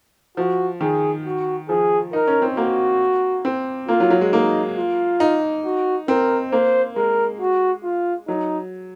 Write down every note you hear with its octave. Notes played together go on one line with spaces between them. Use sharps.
F3 F#4
D#3 G#4
F#4
F3 G#4
D#4 A#4
C#4
C4
A#3 F#4
C4
A#3 F4
F#3
F#3
G#3
A#3 D#4
F4
D#4
F#4
C4 A#4
A#3 C5
G#3 A#4
F#4
F4
F#3 D#4